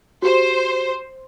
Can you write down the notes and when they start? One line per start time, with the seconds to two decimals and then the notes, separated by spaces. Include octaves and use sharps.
0.22 F#4 G4 C5